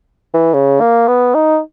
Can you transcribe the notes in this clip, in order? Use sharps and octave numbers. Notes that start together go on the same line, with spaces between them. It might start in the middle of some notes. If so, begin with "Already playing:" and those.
E3
C#3
A#3
B3
D#4